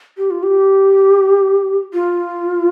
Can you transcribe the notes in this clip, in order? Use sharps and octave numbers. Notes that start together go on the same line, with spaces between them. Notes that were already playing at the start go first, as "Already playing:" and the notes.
G4
F4
G4
F4